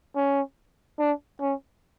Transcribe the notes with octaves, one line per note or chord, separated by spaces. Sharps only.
C#4
D4
C#4